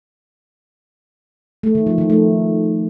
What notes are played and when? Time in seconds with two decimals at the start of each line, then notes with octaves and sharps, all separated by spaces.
1.63 A3
1.75 D#3
1.87 F3
1.98 D#3
2.10 A3